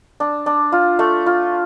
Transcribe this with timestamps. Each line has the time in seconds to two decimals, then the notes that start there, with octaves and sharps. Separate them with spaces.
0.20 D4
0.46 D4
0.72 F4
0.99 A3
1.26 F4